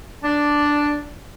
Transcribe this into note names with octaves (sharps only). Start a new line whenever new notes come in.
D4